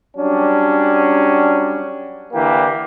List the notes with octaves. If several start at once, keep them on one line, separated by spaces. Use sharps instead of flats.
F#3 G3 C#4 D4
D3 E3 A#3 G4